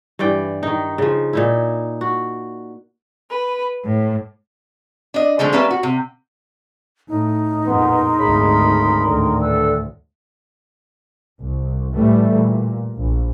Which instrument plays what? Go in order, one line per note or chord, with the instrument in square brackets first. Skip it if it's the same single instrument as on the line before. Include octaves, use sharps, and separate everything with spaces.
[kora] G2 E3 D5 G5
D#3 D#4
C#3 F3
A#2 D#4 E4
F#4
[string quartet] B4
A2
[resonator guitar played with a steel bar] D4 D#5
D3 F3 G#3 A3
G3 A#3 C#4 G4 B4 E5
F#4
C3
[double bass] A2 [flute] D#4
[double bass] F2 A#2 [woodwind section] B3 C#4 [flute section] G#4 A#4 C6
[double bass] G#1 D2 [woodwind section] C#3 B5
[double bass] D2 A2 [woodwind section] D3 D#3
[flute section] A4 B4 E6
[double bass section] C2
A2 E3 G3 A3
A#2
A#1